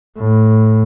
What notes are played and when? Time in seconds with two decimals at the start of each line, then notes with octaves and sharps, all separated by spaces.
0.17 A2